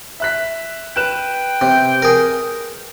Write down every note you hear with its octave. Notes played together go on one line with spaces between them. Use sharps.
E5 F#6 B6
B4 G5 F#6 E7
C3
G#4 A#4